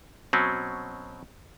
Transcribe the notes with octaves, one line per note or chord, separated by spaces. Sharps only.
B2 F#3 C4 C#4